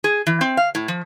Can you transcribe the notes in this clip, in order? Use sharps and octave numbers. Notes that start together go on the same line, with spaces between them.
G#4
E3
C4
F5
A2
F3